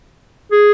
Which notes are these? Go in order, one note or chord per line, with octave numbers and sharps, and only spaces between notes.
G#4